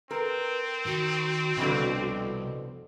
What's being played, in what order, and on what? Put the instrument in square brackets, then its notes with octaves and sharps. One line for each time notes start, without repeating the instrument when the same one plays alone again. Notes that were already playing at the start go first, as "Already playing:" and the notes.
[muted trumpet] C4 [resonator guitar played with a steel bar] A#4 [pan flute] B4
[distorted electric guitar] D#3 [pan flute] F#4
[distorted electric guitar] C2 [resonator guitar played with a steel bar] F2 B2 D3